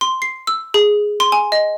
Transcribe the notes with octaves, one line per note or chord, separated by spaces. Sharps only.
C6
C7
E6
G#4
C6
G#5
D#5